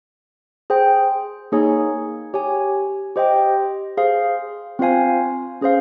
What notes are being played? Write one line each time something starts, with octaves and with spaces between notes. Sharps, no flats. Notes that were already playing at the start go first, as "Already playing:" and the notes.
G#4 C5 G5
A#3 D#4 G#4 C#5 G#5
G4 C#5 G#5
G4 C5 D#5 G5
G#4 C5 F5
C4 F4 C5 F5 G#5
C#4 G#4 C5 F5